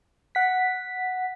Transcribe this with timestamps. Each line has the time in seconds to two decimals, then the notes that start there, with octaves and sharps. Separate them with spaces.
0.35 F#5 B6